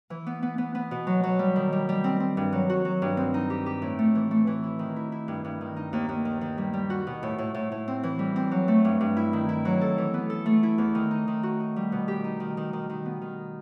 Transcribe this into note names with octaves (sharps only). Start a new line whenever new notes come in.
E3
B3
B3
B3
B3
B2
F#3
F#3
G3
D#3
G3
G3
C4
C4
G2
F#3
F#4
F#3
G2
C4
D#4
G4
G4
A2
A3
E3
A3
E3
E4
D#3
E4
E4
G2
G2
D#3
D#4
D#2
D#2
D#3
D#3
G3
G3
F#4
B2
A2
A2
A2
A2
C4
E3
G3
C4
F#3
A3
G2
G2
E4
D#3
E4
F#3
A4
E3
B3
A4
A3
E4
E2
D#3
D#4
D#3
F#4
D#4
G3
B2
G4
D#4
D#3
D#3
D#3
D#3
B3
D#3